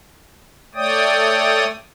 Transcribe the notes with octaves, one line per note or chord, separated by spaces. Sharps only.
A3 C#5 D5 G5 D#6